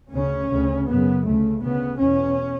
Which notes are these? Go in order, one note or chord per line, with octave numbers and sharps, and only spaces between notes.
D2 C#3 C#4
D2 C#3
F#2 C#3 B3
D2 C#3 A3
D2 C#3 B3
E2 B2 C#4